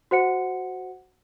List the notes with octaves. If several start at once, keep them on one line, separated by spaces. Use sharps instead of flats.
F#4 C5 F#5 C#7